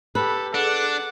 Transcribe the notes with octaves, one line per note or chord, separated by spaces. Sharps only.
G4 A4 B4
D4 G#4 A4 F#5 D6